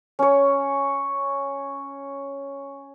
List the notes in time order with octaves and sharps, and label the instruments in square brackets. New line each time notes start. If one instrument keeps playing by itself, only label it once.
[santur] C#4 C#5